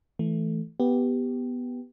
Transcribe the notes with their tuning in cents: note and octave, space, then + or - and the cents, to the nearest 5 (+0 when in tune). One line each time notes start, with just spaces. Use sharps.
E3 +0 A3 +0
B3 +0 G4 +0